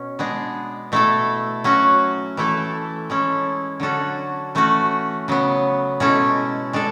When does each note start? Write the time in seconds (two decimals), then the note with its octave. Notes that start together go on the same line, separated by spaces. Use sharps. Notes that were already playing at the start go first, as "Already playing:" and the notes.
Already playing: B2 C#4
0.19 G#3 B3 D4 G#4
0.92 B2 A3 E4 A4
1.64 F#3 C#4 F#4
2.37 E3 A3 E4 A4
3.10 G#3 C#4 E4 A4
3.80 D3 F#3 C#4 F#4 A4
4.55 E3 A3 C#4 F#4
5.28 C#3 F#3 B3
6.00 B2 G#3 C#4 E4 A4
6.73 G#3 D4 A4